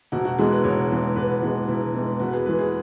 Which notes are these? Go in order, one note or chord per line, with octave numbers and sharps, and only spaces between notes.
E1 F#4
F#4
E2 E3 G#3 G#4
B4
E1 C#5
E2 E3 G#3
E1 B4
E2 E3 G#3
E1 E4
E2 E3 G#3
E2 F#4
B4
G#4
E3 G#3 B4
G#4